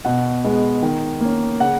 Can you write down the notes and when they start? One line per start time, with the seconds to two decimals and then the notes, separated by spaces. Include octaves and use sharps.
0.05 B2 F#5
0.44 G#3 B3
0.82 D#3
1.21 A#3 C#4
1.60 C#3 F#5